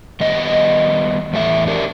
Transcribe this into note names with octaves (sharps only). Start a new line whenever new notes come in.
D#3 G3 B3 D#5
E2 A2 A3 D4 E5
D4 G4 A#4